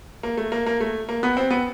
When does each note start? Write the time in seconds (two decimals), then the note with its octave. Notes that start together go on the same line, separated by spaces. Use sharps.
0.23 A#3
0.37 A3
0.52 A#3
0.66 A#3
0.80 A3
1.09 A#3
1.23 B3
1.37 C4
1.50 B3